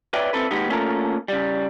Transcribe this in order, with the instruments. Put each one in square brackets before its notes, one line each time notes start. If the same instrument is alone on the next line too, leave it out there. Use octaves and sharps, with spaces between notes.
[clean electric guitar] B4 C#5 D5 E5 G5
C4 E4 A4 B4
D#2 G#3 B3 D#4 G4
A3 A#3 C#4 F4 A4 A#4
C#3 G3